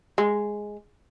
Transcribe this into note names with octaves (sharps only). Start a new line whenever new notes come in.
G#3